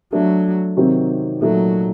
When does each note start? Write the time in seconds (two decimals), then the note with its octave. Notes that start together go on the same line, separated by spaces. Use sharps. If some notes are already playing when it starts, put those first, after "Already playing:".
0.13 F#3 A3 D4 A4
0.77 C3 D#3 F#3 C4 D#4
1.41 A#2 F#3 A3 D#4 A4